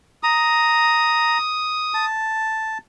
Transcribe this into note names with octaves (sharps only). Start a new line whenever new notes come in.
A#5 D#6
A5